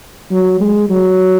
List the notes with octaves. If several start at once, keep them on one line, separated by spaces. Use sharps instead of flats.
F#3
G#3
F#3